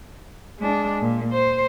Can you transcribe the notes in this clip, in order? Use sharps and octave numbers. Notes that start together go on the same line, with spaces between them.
G#3 D4
A#2
C5